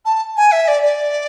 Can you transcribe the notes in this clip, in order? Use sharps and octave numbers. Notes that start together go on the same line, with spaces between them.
A5
G#5
E5
D5
D5